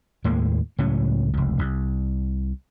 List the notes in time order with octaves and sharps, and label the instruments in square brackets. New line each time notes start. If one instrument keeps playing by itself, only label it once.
[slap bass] D#2 A2 G#3 A#3
C#2 A2 F#3 C#4
F1 C#2
C2